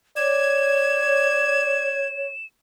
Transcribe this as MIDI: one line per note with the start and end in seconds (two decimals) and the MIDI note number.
0.16 2.27 73
0.16 2.01 74
0.16 2.08 92
0.16 2.46 100